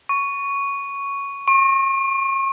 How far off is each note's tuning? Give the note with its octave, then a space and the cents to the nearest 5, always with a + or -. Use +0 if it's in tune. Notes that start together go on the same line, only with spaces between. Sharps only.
C#6 +5
C#6 -40